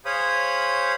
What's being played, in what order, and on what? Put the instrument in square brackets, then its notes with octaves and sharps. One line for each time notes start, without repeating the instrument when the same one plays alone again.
[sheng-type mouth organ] G#4 C5 C#5 F5 B5 D#6